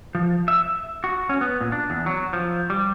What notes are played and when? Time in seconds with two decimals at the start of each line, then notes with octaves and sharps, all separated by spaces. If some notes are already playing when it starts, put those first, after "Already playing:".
0.15 F3
0.48 E5
1.04 F#4
1.29 C#4
1.41 B3
1.61 A#2
1.72 D4
1.90 E2
2.06 F#3
2.33 F3
2.70 G3